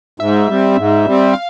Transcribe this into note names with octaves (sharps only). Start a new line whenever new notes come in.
G#2 E5
G3 C4
G#2
G3 C4
F5